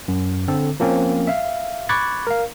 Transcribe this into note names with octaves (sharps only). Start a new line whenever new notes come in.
F#2
D3 C4 A4
F3 A#3 C4 C#4
E5 F5
B5 C#6 D6 F#6 G#6 A6
A#4 F5